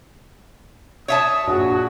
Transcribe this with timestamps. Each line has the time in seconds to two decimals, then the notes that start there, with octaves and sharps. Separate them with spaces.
1.08 C#5 E5 A5 D#6
1.47 A#1 F#4 G#4